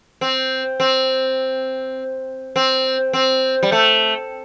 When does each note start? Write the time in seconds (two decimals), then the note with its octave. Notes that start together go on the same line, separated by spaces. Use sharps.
0.21 C4
0.80 C4
2.56 C4
3.13 C4
3.63 G3
3.72 A3